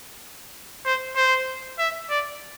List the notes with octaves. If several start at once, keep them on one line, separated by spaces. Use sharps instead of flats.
C5
C5
E5
D5